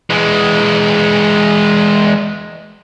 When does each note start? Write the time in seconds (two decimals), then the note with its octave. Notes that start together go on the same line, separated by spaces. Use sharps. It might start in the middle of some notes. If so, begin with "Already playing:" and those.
0.10 E3 G#3